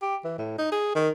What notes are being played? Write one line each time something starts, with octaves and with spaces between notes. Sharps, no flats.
G4
E3
A2
D#4
G#4
D#3